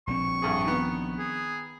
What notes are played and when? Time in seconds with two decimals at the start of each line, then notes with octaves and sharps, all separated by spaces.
0.07 A#1 D3 C4 C#6
0.42 A1 G2 G#4
0.66 D#3 B3
1.19 G#4